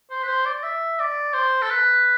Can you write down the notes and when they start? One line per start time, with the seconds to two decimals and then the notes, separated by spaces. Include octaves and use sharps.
0.11 C5
0.23 B4
0.28 C5
0.46 D5
0.63 E5
1.00 D5
1.34 C5
1.62 A4
1.70 B4